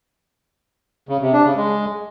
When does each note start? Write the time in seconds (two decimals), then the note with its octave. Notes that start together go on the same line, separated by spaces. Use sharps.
1.09 C#3
1.21 C3
1.33 D4
1.45 C#3
1.57 G#3